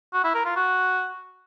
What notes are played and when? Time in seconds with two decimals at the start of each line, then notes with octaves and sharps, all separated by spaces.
0.13 F#4
0.24 E4
0.35 A#4
0.45 F4
0.56 F#4